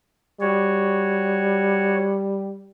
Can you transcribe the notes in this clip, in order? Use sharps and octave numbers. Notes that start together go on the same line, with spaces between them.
G3 F#4 C#5